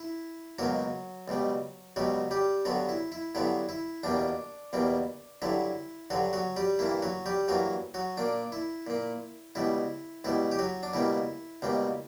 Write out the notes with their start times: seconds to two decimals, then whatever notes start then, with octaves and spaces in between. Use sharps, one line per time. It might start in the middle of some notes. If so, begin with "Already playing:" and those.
Already playing: E4
0.58 C#2 B2 F#3 A#3 F#4
1.28 C#2 B2 G3
1.96 C#2 B2 F#3 G3 F#4
2.31 G3 G4
2.65 G2 D3 F#3 B3 F#4
2.89 E4
3.12 E4
3.35 G2 D3 F#3 B3 E4
3.69 E4
4.03 E2 B2 G3 A#3 D4
4.73 E2 B2 G3 A#3
5.42 G2 D3 F#3 E4
6.10 G2 D3 F#3 F#4
6.33 F#3 F#4
6.56 G3 G4
6.79 G2 E3 A#3 E4
7.02 F#3 F#4
7.26 G3 G4
7.48 G2 E3 F#3 A#3 F#4
7.94 F#3 F#4
8.17 A#2 A#3 D4
8.52 E4
8.87 A#2 A#3
9.55 C#2 B2 G3 E4
10.24 C#2 B2 G3 E4
10.51 G4
10.59 F#3 F#4
10.83 D4
10.93 C#2 B2 G3 A#3 E4
11.62 C#2 B2 G3 A#3